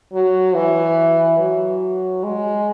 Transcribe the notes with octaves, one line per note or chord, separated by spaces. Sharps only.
F#3
E3
F#3
G#3